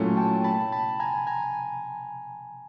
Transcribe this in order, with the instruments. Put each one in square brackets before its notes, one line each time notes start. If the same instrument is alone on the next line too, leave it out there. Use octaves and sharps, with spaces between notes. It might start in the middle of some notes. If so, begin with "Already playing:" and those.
Already playing: [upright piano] A#2 F#3 A3 C#4 E4
[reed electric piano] G5 A5
A5 B5
A5 B5
G#5 A#5
G#5 A#5